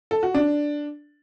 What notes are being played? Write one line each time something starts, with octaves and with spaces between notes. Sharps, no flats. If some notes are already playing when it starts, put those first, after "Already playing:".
A4
F#4
D4